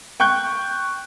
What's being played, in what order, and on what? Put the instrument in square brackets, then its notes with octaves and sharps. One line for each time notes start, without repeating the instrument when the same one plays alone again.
[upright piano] G5 C#6 F#6 G6